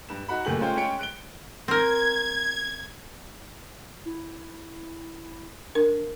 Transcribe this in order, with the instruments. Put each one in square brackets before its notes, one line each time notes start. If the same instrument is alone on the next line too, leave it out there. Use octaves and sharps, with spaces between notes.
[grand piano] G2 E7
D#4 F#4 F#5 B5
F#1 A#2 A3 G4 G#4 F#7
G#3 A3 C#4 F4 C5 G5
G#3 C#4 C#5 G5 C#7 D7
F#6 D7 G7
[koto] C4 A#4 [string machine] G#6
[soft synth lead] E4
[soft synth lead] D4 [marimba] A#4